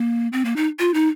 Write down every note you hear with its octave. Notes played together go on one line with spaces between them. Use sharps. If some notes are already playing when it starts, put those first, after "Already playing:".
Already playing: A#3
C4
A#3
D#4
F4
D#4